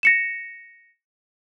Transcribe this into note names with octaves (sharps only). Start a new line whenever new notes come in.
A#6 C#7 E7